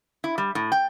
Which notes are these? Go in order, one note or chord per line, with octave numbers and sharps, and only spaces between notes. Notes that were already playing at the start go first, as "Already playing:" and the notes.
E4
G3
A2
G5